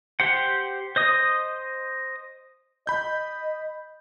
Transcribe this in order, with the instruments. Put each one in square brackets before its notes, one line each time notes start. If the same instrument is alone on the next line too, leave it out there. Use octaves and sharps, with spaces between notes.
[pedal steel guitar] G4 C5 F#5
C5 D#5 D#6
[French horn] D#5 [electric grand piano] B5 G6